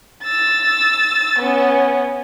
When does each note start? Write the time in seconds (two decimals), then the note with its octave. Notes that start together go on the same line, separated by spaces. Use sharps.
0.24 E6 A6
1.38 B3 C#4